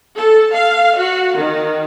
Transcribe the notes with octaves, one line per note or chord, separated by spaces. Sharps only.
A4
F5
F#4
D#3